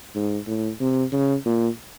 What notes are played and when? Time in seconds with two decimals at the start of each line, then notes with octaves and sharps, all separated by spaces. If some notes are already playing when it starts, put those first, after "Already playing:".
0.15 G#2
0.47 A2
0.80 C3
1.12 C#3
1.45 A#2